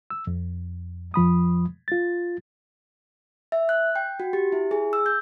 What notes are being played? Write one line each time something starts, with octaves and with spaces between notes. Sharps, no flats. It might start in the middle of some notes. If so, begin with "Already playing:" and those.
E6
F2
F2 F3 B5 D#6
F4 A6
E5
F#6
G5
F#4
G4
E4
G#4
E6
G6